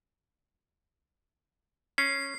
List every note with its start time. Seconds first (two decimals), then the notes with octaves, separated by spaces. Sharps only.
1.98 C#4 C7